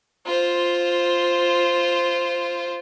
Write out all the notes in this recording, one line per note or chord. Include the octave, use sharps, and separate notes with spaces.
F4 C5